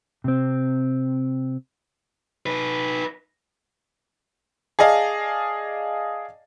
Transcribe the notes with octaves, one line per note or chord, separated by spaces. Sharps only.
C3 C4
D#4 B4
G#4 D5 D#5 F5 A5